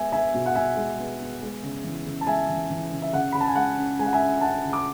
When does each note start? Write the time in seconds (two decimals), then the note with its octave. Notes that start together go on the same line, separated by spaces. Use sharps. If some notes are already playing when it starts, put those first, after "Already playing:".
Already playing: G#3 B3 E5 G#5
0.12 B3 E5 G#5
0.34 B2
0.46 F#5
0.55 B2 E5 G#5
0.77 G#3
0.99 B3
1.20 B3
1.42 G#3
1.63 C#3
1.84 E3
2.06 C#3
2.21 A5
2.27 G#3 E5 G#5
2.48 E3
2.69 E3
2.91 C#3
3.02 E5
3.13 C#3 F#5
3.32 C#3 B5
3.40 A5
3.47 G#5
3.55 G#3 F#5
3.78 C#4
3.99 G#3 G#5
4.06 F#5
4.13 E5 G#5
4.20 C#4
4.41 C#4 F#5 A5
4.63 C#3
4.73 D6